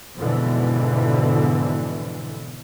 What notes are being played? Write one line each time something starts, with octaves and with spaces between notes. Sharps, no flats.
F2 G#2 B2 D3 E3